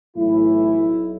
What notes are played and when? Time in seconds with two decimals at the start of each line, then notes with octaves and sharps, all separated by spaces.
0.16 B1 A2 E3 E4
0.80 B1 B2